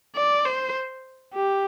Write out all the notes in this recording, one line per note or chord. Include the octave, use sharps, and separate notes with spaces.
D5
C5
G4